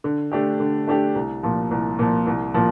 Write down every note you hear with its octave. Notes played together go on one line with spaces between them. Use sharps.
D3
A3 D4 G4
D3
A3 D4 G4
C2
A#2 F3
C2
A#2 F3
C2
A#2 F3